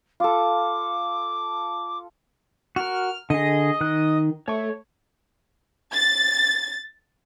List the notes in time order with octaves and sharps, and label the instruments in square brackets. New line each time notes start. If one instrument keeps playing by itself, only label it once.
[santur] F4 A4 [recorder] D6
[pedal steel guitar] F#4 A#4 [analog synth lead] F6
[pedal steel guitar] D3 G#4 [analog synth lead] D#5
[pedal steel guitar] D#3 F#6
[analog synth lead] A3 [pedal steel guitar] C#5 C#6
[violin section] A6